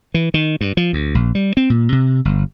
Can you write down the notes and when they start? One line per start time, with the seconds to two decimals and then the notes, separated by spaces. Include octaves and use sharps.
0.14 E3
0.34 D#3
0.61 G2
0.77 F3
0.93 D2
1.15 A#1
1.35 G3
1.57 C4
1.70 A#2
1.92 C3
2.25 G1